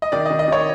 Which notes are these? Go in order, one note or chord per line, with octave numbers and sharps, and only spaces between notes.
D#5
D#3 D5
D#5
D#3
D#5
D#3 C#5